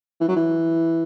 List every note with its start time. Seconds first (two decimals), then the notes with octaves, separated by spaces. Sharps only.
0.21 E3
0.28 F#3
0.36 E3